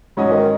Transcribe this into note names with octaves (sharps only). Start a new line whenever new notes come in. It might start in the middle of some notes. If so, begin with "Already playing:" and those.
G#2 F#3 G#3 C#4 F#4 D#5
D#3